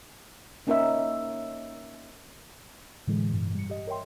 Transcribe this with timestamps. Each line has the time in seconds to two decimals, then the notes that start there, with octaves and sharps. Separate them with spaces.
0.67 A#3 C#4 D#4 A#4 D#5 E5
3.07 A2 D3 E3 G#3
3.29 G2 B2 E3
3.55 G3 C#7
3.70 G4 D#5
3.87 A#4 C#5 E5 G5 C6